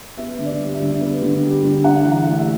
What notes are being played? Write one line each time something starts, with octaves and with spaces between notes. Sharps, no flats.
B3 E5
D3
D5
G3
E5
D3
B3
D3
G3
D3
D4 F#5
E3
F#5
A3
E5